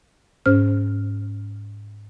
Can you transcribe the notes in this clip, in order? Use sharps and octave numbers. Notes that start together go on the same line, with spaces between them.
G#2 C#4 C5 F6